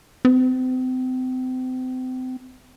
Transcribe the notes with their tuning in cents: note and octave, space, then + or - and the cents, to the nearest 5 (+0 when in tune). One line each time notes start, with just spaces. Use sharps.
C4 -35